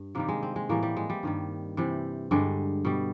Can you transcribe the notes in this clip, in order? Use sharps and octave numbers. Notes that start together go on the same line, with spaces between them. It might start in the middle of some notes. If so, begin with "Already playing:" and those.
Already playing: G2
C3 D#3 G3 A#3
G#3
C4
G#3
A2 E3 G3 A#3
G3
G#3
G3
G2 D#3 G3
C3 E3 G3
G2 D3 G3 G#3
B2 G3